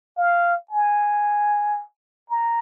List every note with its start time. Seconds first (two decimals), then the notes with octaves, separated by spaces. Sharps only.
0.18 F5
0.71 G#5
2.30 A#5